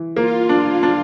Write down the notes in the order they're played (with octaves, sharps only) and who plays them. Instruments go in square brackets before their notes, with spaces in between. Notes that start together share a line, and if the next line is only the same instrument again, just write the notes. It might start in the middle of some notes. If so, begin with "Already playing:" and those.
Already playing: [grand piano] E3
[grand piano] A#3 [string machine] F4
[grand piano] D4
D4